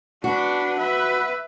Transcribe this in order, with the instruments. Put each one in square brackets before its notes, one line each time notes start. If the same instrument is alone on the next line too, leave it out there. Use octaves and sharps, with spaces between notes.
[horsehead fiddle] D4 B4 [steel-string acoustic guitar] F#4
[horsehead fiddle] B4 E5